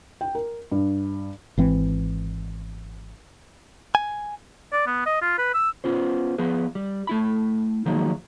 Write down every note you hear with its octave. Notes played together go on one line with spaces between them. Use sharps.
G5
A#4
G2
G#1 E3 C4
G#5
D5
B3
D#5
F4
B4
E6
B3 C#4 F4 C5
F3 B3 G#4 B4
G3
A3 E4 B5
D#3 F3 F#3 G#3 A#3 D#4